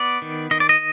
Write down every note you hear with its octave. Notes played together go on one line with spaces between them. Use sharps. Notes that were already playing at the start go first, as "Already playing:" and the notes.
Already playing: B3 D5
D#3
D#3 D#5
D5
D#5